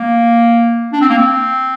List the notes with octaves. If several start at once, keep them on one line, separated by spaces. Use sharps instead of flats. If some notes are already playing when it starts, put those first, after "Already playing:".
Already playing: A#3
D4
C4
A#3
C4